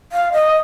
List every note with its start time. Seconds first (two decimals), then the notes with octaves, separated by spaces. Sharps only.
0.12 F5
0.32 D#5